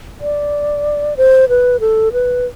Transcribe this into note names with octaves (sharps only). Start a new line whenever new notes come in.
D5
C5
B4
A4
B4